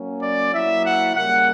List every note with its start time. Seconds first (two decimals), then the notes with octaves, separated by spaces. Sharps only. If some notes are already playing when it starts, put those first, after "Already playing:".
Already playing: F#3 A#3 C#4
0.22 D5
0.53 F#3 A#3 E4 E5
0.84 F#5
1.15 C#3 G3 A#3 F#5